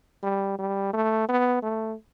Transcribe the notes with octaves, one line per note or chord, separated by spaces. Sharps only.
G3
G3
A3
B3
A3